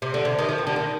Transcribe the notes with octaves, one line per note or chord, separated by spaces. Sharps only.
C3
D3
C3
D#3
F3
G3
D3
D#3